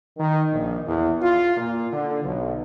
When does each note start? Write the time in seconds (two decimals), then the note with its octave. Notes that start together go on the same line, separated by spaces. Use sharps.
0.17 D#3
0.52 A#1
0.87 E2
1.22 F4
1.57 A#2
1.93 D3
2.24 B1